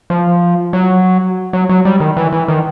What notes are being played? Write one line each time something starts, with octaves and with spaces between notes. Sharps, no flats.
F3
F#3
F#3
F#3
G3
D#3
E3
E3
D#3